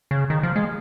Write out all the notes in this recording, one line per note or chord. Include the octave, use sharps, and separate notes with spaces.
C#3
D#3
F3
G#3